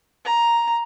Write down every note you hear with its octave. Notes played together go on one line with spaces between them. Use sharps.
A#5